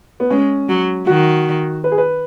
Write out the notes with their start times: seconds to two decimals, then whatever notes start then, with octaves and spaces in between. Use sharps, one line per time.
0.20 B3
0.30 G#3 C#4
0.69 F#3
1.07 D#3 F#4
1.84 B4
1.92 G#4
1.98 B4